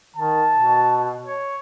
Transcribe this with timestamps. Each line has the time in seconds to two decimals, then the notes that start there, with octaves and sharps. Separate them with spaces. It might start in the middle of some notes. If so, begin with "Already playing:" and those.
0.16 D#3 A5
0.56 B2
1.26 C#5